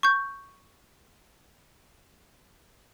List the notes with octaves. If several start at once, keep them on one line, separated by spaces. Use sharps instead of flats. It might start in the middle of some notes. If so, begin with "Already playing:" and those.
C#6 G6